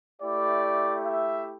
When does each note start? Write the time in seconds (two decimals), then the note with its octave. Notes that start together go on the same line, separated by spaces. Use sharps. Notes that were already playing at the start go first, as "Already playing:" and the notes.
0.20 A3 E4 G4 D5
1.06 E5